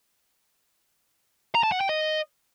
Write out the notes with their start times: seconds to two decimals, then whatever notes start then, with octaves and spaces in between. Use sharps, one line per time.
1.55 A#5
1.63 A5
1.72 F#5
1.81 G5
1.89 D#5